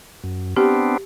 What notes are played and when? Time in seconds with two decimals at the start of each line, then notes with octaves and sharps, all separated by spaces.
0.24 F#2
0.56 B3 C4 D4 G4